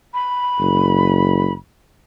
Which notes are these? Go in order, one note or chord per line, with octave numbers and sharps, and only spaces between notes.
B5
F#1